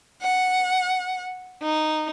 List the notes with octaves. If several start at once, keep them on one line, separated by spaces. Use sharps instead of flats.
F#5
D#4